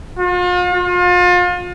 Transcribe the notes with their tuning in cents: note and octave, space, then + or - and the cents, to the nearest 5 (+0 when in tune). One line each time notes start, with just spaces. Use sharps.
F4 +40
F4 +35